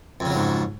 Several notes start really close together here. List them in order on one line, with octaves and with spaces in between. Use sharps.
F2 C#3 F#3 G#2